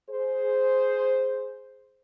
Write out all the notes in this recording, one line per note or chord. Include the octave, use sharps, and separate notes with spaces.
G#4 C5